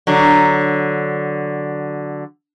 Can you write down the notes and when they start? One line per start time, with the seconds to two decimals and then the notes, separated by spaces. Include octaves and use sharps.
0.07 D3 F#3